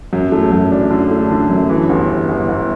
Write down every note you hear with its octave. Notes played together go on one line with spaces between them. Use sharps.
F#2
A3
F#2
D4
D3
A3
D3
F#2
E3
G1
G1
G1
G1